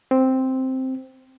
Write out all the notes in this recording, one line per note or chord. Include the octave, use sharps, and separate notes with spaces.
C4